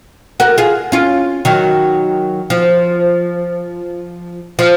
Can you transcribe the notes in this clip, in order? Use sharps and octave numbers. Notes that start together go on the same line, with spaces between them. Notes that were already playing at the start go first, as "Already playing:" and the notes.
F#4 A#4
F4 G#4
C#4 F4
D#3 F#3
F3
F3